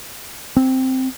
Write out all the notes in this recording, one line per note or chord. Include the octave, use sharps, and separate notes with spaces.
C4